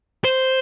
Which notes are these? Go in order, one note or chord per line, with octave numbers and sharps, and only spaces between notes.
C5